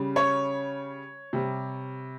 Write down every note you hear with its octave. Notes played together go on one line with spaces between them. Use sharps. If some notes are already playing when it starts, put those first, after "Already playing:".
Already playing: C#3 G3
C#5
C3 G3